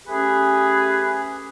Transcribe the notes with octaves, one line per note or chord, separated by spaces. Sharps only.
A3 C#4 G4 G#4 B4 G#5